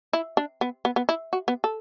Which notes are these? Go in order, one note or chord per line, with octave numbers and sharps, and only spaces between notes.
E4
D4
B3
B3
B3
E4
F#4
B3
A4